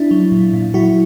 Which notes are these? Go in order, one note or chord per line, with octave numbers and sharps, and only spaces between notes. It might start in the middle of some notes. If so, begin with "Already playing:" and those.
Already playing: D4 E4
F#3
A#2
A#2
F#3 E4 F#4